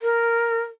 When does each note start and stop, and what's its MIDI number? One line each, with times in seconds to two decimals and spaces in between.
0.02 0.64 70